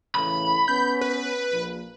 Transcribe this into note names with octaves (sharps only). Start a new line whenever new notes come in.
A2 C#3 E3 B5
B3 C#4 G6
B4
A#1